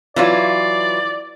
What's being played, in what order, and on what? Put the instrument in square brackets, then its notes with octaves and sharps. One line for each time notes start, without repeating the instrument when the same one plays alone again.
[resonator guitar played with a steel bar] E3 F#3 F4 [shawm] D5